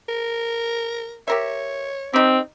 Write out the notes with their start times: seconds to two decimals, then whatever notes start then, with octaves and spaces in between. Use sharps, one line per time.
0.09 A#4
1.28 G4 A#4 C#5 E5
2.13 C4 D#4 G4